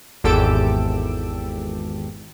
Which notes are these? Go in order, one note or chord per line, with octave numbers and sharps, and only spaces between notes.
G#1 E2 G4 A4 E6 D7